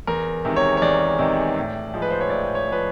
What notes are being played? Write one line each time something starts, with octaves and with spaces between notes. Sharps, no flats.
E2 A#4
C3 D#3 G#3
C#5
C#5
E2 D5
C3 D#3 G#3
A2
F3 G#3
B4
C5
C#5
A2 D5
C#5
F3 G#3 B4